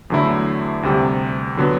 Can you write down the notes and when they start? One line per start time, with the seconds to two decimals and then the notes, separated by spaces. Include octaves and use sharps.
0.10 E2 D3 F#3 A3 E4
0.83 D2 C3 G3
1.57 D3 F#3 B3